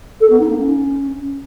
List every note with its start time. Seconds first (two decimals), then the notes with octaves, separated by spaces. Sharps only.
0.20 A4
0.30 B3
0.39 D#4
0.49 A#3
0.59 C#4